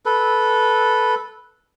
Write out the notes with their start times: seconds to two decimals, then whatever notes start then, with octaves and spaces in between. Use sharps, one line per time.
0.06 A4 B4